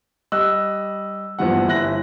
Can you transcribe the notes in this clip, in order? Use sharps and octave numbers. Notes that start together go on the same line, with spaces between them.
G3 D#5 E6 F#6
F#1 G2 E3 F3 B3 F#5
G1 E4 F#6 A#6 F#7